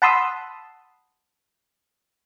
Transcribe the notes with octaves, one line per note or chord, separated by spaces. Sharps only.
F#5 A5 B5 C6 D#6 E6